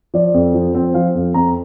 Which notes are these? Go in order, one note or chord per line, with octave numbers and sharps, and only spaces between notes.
F3 D5
F2
F3
C4
F3 F5
F2
F2 A#5